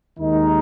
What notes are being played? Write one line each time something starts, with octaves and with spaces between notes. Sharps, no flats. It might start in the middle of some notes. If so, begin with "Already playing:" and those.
D#2 D#3 G#3 D#4